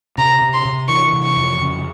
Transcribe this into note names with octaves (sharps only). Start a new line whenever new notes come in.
C3 A#5
C3
C6
C3
E3 C#6
C3
C#6
F2
C#3